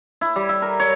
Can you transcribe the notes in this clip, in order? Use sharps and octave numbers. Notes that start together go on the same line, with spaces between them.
E4
G3
E5
A#4
C#5